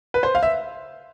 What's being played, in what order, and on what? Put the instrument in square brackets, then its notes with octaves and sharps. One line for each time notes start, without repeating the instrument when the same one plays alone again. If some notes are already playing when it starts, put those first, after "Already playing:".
[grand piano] B4
C5
F5
E5